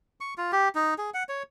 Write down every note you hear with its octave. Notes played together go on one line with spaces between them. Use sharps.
C#6
F4
G4
D#4
G#4
F#5
C#5